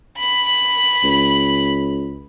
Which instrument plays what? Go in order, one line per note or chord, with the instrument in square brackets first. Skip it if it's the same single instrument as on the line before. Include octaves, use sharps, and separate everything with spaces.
[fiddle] B5
[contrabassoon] C#2